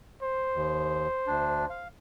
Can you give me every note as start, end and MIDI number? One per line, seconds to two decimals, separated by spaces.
0.23 1.87 72
0.55 1.07 39
1.27 1.65 38
1.27 1.65 62
1.70 1.88 77